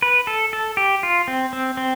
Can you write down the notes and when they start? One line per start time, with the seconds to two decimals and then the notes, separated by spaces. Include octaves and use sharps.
0.02 B4
0.27 A4
0.53 A4
0.77 G4
1.03 F4
1.28 C4
1.53 C4
1.77 C4